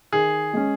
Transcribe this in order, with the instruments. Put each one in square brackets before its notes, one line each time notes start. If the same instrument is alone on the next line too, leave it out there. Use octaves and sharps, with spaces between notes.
[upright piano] D#3 [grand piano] G#4
[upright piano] G#3 C#4